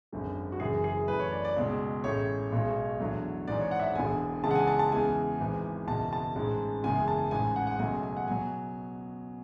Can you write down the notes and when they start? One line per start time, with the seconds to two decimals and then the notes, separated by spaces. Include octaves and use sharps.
0.12 G#1 F#2 D3 G#3
0.52 F#4
0.60 F#1 F#2 E3 G#4
0.84 G#4
1.08 F#2 E3 A3 B4
1.19 C#5
1.32 D5
1.45 D5
1.56 C#2 B2 G#3
2.04 A1 A2 G#3 C#5
2.52 B1 B2 G#3
3.00 E2 D3 F#3 A3
3.47 G#1 G#2 E3 G#3 D5
3.60 C#5
3.71 F#5
3.80 E5
3.83 F#5
3.95 E1 E2 D3 G#5
4.43 C#2 C#3 E3 G#3 A5
4.51 F#5
4.55 G#5
4.67 A5
4.79 A5
4.91 E2 C#3 E3 G#3 G#5
5.40 G#1 G#2 E3
5.87 F#1 E2 B2 A5
6.13 A5
6.35 A1 G#2 G#3
6.84 F#1 E2 C#3 G#3 G#5
7.08 A5
7.31 A1 G#2 G#3 G#5
7.56 F#5
7.67 F#5
7.79 C#2 B2 F#3 A3 G#5
8.03 G#5
8.17 F#5
8.28 B2 F#3 G#5